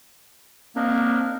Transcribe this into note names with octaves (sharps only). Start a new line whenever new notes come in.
A#3 C4 D4 D#4 A#4